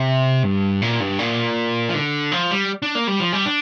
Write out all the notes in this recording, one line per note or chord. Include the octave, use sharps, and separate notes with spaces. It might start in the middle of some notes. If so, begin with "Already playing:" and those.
Already playing: C3
G2
A#2
G2
A#2
F3
D3
F3
G3
D4
A#3
G3
F3
G3
D4